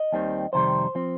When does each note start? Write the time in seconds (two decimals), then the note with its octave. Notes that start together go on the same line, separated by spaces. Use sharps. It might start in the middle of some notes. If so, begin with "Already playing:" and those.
Already playing: D#5
0.12 D#2 D#3 G3 C4
0.53 F2 C3 D#3 G3 C5
0.95 F3 C4